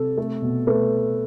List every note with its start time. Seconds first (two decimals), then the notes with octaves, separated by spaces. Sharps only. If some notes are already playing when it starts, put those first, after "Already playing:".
Already playing: C3 A4
0.17 A3
0.42 B2
0.67 A3 B4